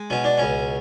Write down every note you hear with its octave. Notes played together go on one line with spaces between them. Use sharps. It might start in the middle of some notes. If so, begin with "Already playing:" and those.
Already playing: G#3
B2 C#4
D4
C#2 C#4